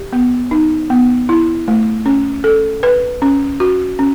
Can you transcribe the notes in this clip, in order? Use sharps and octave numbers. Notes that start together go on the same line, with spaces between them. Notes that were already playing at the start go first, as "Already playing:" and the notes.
Already playing: G4
B3
D#4
B3
E4
A3
C#4
A4
B4
C#4
F#4
C#4